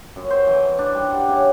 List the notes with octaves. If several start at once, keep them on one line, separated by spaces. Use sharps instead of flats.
F#2
C5
E3
D4
G3
F#5
C#3